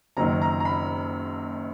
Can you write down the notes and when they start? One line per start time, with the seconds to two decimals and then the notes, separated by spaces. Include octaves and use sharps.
0.17 F#1 F#2 D#3 A#5
0.42 A#5
0.60 A#5
0.65 B5